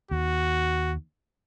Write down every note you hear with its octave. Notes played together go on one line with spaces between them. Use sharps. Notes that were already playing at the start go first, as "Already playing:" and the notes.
D#2 F#4